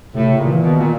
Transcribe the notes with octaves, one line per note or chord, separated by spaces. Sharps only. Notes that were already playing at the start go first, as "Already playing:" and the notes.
A2 C3
C#3
A#2
E3
B2 D#3
A#2